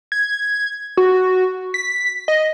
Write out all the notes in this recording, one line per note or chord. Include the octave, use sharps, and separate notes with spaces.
G#6
F#4
B6
D#5